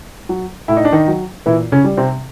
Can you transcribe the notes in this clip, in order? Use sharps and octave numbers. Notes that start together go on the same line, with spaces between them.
F#3
A2 E4
D#4
D4
D#3 D#4
F#3
A#2 E3 E4
C#3 C#4
G3
C3 C4